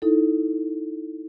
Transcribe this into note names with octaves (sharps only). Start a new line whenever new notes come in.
D#4 E4 A4